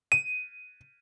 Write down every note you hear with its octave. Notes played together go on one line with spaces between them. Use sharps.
D#7